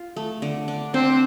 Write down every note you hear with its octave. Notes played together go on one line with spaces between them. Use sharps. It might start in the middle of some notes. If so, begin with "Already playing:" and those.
Already playing: F4
A3
D3
D4
C4 D4